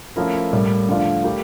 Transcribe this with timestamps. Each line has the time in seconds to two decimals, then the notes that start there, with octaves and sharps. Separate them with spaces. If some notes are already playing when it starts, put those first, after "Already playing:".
0.16 F3 A3 C#4 E4 A#4
0.53 A2 G3 A#3
0.89 D3 F3 A3 D4 F4
1.24 A3 E4 G4 A#4